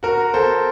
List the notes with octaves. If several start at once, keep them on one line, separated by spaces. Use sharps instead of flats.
F#4 A#4
A4 C5